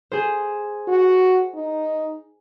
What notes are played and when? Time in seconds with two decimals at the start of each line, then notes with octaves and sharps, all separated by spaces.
0.12 G#4 C5
0.88 F#4
1.55 D#4